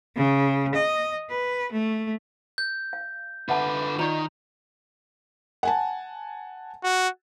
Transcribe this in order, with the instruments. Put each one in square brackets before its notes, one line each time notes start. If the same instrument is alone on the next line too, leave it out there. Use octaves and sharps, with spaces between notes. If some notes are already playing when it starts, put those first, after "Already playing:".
[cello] C#3
D#5
B4
A3
[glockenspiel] G6
[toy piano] F5
[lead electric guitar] D3 B4 [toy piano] E5 F#5 A5
[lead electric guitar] D#3 [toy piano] F4 D5 C#6 [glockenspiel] A#5
[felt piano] F#5 G#5 A5
[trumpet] F#4